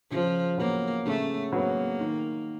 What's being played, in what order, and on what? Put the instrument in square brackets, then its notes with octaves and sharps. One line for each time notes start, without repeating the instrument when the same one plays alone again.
[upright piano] C#3 [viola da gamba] F3
[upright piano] F#3 B3 [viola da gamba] A#3
[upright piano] C#3 [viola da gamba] A3
[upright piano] F#3 B3 [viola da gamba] A#3
[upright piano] D#3